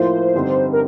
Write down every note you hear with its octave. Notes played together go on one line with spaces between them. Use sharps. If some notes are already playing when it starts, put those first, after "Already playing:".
Already playing: A2 F3 A#3 F4 C5
G2 D3 G3 C4 D#4
A#4